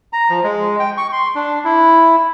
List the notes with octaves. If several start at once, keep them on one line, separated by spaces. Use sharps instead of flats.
A#5
F3
G#3
G5
C#6
C6
D4
E4